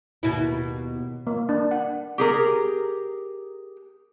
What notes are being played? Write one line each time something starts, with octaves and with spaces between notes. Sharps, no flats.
D#2 B2 E4
A#3
D4
F#5
G4 G#4 A#4